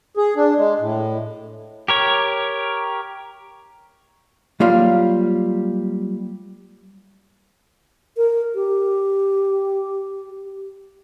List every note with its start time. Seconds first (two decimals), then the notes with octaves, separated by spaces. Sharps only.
0.17 G#4
0.36 D4
0.58 G#3
0.80 A2
1.88 G4 A#4 C#5
4.60 F#3 G3 A#3 F4 F5
8.17 A#4
8.55 G4